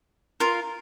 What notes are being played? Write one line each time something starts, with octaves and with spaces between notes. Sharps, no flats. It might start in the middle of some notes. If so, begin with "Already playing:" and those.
F4 A#4 F5